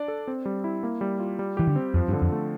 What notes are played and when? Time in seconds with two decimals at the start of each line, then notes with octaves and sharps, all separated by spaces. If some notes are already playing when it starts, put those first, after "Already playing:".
Already playing: D4 D5
0.08 A4
0.28 C4
0.45 G3
0.64 E4
0.83 A#3
1.01 G3
1.20 F4
1.39 G3
1.57 E3 G4
1.67 D3
1.76 C4
1.94 F2 F3
2.08 G2
2.13 D3
2.22 F2
2.32 A3